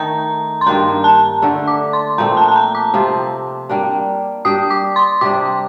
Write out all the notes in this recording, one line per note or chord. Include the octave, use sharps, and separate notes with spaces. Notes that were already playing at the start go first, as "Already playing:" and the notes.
Already playing: D#3 A3 D#4 A4 A#5
C6
G2 D#3 A#3 D4 A#5
A5
D3 A3 D4 A4
D6
C6
A#2 F3 A3 C4 A#5
A5
A5
A#5
D6
C3 F3 C4 F4
G3 A#3 D4
G3 D4 G4 D#6
D6
C6
C3 G3 D4 D6